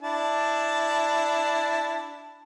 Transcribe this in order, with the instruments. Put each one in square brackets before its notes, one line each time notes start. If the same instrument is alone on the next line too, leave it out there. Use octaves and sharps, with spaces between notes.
[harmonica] D4 E4 A5